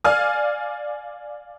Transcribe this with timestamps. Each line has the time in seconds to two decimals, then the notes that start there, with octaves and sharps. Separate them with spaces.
0.04 D5 F5 G#5 F6